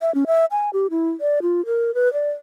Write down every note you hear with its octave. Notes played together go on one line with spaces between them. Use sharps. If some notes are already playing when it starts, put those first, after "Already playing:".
E5
C#4
E5
G#5
G4
E4
D5
F4
A#4
B4
D5